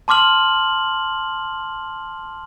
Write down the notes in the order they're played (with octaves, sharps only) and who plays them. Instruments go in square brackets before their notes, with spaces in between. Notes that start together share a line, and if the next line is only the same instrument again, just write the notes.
[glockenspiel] A5 C6 D6 F6 F#7